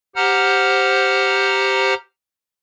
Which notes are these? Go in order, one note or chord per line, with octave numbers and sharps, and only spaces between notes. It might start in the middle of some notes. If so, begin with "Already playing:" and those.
G4 C5 F#5 A#5 F6